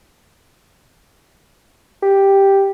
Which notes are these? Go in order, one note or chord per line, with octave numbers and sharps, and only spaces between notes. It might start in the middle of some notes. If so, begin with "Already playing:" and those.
G4